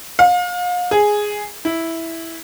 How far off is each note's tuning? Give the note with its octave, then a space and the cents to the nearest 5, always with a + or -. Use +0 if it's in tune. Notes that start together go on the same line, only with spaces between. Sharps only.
F5 +35
G#4 +0
E4 -5